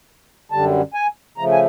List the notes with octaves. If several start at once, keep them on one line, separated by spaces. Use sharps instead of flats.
F#2 D3 G3 A5
G#5
C#3 F3 A3 A#5
G#5